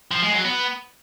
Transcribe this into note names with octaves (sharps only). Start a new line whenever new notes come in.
F3
G#3
F#3
B3